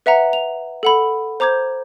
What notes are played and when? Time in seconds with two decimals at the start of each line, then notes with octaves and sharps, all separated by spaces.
0.06 B4 E5 F#5 A#5
0.33 F7
0.83 A4 F#5 B5
1.40 C5 A#5 D6 G6 G#6